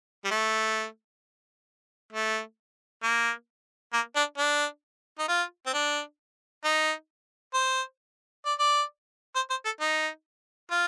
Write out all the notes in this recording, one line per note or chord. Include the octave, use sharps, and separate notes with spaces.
G3
A3
A3
A#3
A#3
D4
D4
D#4
F4
C4
D4
D#4
C5
D5
D5
C5
C5
A4
D#4
F4